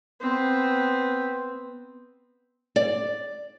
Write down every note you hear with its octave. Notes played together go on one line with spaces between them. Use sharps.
B3 C4
D5